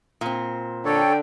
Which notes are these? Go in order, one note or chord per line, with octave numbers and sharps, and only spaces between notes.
A#2 C4
D3 A4 C#5 G5